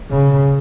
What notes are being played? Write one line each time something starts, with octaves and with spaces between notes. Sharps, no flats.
C#3